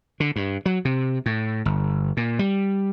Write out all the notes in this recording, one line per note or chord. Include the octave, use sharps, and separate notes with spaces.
D3
G2
F#3
C3
A2
G1
A#2
G3